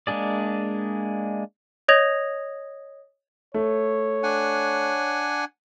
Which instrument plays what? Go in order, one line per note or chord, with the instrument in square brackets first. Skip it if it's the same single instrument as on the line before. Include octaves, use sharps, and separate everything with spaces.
[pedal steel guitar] G#3 A#3 D4 G#4 D5
[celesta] C#5 D#5 D#6 G#6 A#6 F7
[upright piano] A3 [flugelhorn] C#5
[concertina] D4 F#5 G#5